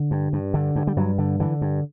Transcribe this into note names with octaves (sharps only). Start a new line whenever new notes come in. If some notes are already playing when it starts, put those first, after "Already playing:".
Already playing: D3
G2
G2
D3
G2
G3
G2 F#3
D3
D3 E3
G2